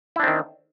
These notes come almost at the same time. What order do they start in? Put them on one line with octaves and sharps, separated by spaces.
E4 D4 C4 D#3